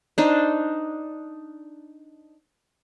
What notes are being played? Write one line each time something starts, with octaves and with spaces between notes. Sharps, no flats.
D4 D#4 C5